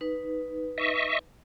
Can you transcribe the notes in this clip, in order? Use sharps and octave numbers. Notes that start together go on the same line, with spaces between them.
D#4 B4
D#5 E5 C#6